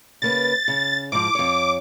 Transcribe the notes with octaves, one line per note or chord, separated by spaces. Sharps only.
C#3 A#3 B4 A6
C#3
G#2 F3 D6
F2 C#5